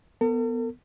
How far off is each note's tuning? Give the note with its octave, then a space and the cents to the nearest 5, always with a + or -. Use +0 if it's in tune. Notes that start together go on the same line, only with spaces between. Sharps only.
B3 +0 A4 +45